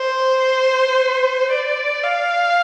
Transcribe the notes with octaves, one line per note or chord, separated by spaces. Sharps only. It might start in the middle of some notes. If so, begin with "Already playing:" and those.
Already playing: C5
D5
F5